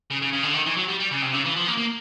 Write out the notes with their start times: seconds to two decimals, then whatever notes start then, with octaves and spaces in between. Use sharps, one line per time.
0.10 C#3
0.22 C#3
0.33 C#3
0.43 D3
0.54 D#3
0.66 E3
0.77 F#3
0.88 G3
1.00 G3
1.11 C#3
1.22 C3
1.33 C#3
1.45 E3
1.56 F3
1.67 A#3
1.77 A#3